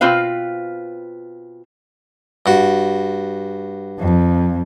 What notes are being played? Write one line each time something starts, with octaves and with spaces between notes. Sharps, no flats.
B2 C4 F4 B4 F5
G2 F#4
F2